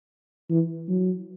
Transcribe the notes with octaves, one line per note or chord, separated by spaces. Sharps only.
E3
F#3